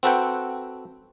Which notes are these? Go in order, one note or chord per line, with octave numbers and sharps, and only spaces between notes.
C4 F#4 A4 B4 F#5 G5